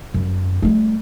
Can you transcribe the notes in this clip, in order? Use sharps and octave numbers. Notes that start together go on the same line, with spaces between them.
F#2
G3 A3